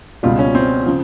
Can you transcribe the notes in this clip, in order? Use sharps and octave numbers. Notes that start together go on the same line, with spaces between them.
C#2 B2 G3 F4
C#4
C4
C#3 F3